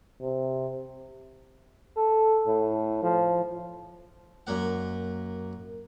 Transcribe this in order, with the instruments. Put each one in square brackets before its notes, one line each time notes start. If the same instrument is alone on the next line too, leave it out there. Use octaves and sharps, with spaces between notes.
[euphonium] C3
[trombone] A4
A2
F3
[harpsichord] F#2 A#3 F#5